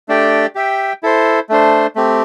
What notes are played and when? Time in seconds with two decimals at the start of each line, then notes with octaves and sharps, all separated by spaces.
0.08 A3 D4 G4 D5 G5
0.55 G4 E5 G5
1.03 E4 A4 C5
1.49 A3 D4 C5
1.95 A3 C4 G4